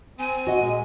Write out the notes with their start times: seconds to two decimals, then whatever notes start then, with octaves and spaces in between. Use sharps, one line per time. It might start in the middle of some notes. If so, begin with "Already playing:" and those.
0.19 C4 G#5
0.47 F#4 D#5 F#5
0.61 A#2 G#3